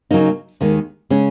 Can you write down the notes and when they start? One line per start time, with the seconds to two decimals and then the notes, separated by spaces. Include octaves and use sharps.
0.11 C#3 F#3 A#3 D#4
0.61 D#2 D#3 G#3
1.10 C#3 G#3 C#4